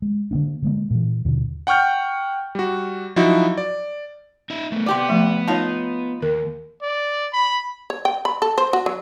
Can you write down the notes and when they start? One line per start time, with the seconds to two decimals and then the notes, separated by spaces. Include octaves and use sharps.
0.02 G#3
0.31 D3 A#3 D4
0.62 D3 G#3 A#3
0.91 A#2 E3
1.25 D#2 B2 D3
1.67 F#5 G5 C#6 F6 G6
2.55 G3 F#4
3.16 F3 F#3 D#4 E4 F#4
3.57 D5
4.50 D#4 E5
4.72 A3 B3
4.86 C3 B3 G4 D5
5.08 F3 A3 E5
5.48 D#4 F4 C#5 A5
6.22 D#2 A#4
6.82 D5
7.33 B5
7.90 C#5
8.05 G5
8.25 B5
8.42 A4
8.58 C5
8.73 F#4
8.86 F#3